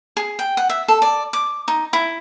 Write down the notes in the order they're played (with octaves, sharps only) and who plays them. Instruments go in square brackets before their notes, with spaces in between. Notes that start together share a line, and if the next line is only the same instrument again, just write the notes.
[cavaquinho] G#4
G5
F#5
E5
A4
D5
D6
D#4
E4